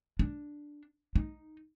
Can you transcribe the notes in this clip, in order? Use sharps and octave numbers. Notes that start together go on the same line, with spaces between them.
D4
D#4